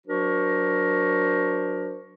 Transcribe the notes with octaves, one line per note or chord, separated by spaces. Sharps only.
F#3 D4 F#4 A#4 C5